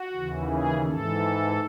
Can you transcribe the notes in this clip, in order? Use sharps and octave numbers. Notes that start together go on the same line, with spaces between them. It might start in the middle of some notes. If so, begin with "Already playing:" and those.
Already playing: F#4
D#2 C#3 E3
G#4
G#2 E3 A4